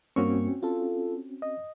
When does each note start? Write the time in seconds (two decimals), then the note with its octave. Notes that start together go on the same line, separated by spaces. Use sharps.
0.16 G2 A#3 C4 C#4 F#4 C#6
0.63 F4 A4
1.42 D#5